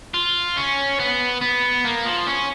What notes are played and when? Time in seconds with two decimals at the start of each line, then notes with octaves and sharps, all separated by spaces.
0.14 F4
0.57 C#4
1.00 B3
1.41 B3
1.85 A#3
2.05 F3
2.27 C#4